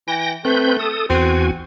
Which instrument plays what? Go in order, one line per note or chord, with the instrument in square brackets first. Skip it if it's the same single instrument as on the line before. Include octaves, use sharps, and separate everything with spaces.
[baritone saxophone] E3 [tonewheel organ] G5 A#6
[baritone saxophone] A3 [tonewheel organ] C4 B4 G6
[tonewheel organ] A4 D#6
[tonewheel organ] E2 F#4 G#5 [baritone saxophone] C4